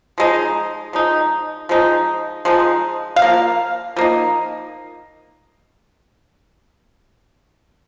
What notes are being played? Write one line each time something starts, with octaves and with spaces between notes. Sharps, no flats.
F3 G#3 D#4
F3 G#3 D#4
F3 G#3 D#4
F3 G#3 D#4
F5
F3 A#3
F3 A#3 D#4